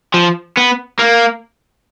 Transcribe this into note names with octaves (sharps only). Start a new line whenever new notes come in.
F3
B3
A#3